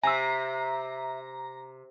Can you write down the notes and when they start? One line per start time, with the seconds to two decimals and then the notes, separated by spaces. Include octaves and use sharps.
0.03 C3 E5 G#5 A#5 E6